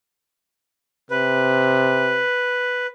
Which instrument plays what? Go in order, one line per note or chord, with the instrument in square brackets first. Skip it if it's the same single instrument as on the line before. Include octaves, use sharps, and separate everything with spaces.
[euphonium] C3 [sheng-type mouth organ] B4